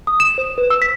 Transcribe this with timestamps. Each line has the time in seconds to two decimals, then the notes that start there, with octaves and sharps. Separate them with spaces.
0.07 D#6
0.20 E7
0.38 C5
0.58 B4
0.70 E6
0.82 B6